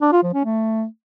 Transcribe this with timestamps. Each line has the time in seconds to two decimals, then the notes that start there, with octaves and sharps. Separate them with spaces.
0.02 D4
0.12 F4
0.23 F3
0.34 C#4
0.44 A3